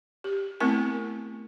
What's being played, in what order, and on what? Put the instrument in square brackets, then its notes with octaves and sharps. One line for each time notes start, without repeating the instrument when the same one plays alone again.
[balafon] G4
A3 B3 C4 E4 A#4 G#5